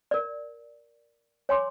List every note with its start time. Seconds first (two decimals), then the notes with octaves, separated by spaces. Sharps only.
0.11 A#4 D5
1.49 C#5 G#5 C6 D6